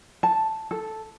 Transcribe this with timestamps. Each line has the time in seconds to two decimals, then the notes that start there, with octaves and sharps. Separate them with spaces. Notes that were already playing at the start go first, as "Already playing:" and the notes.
0.23 A5
0.71 A4